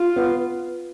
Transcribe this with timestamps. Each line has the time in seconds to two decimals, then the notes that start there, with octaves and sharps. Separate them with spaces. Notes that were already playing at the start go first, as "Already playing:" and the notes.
Already playing: F4
0.16 B3